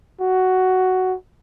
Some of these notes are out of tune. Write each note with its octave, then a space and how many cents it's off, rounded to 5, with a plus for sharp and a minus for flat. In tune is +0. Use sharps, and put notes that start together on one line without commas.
F#4 +5